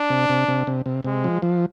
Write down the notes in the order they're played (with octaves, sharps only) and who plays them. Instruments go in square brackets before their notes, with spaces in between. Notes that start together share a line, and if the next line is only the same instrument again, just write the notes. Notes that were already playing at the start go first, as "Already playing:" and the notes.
Already playing: [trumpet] D4
[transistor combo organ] C3
C3
C3
C3
C3
[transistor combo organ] C3 [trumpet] G#3
[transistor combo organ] F3
F3